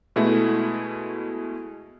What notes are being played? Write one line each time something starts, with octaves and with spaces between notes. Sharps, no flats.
B2 G#3 A3 E4